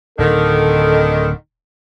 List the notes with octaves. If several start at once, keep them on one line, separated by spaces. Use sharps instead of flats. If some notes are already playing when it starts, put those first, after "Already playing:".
D1 D3 D#3 A4